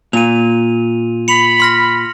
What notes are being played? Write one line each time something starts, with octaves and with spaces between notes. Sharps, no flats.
A#2 D#7 F7
B5 C#7 F7 F#7
C6 F6 A#6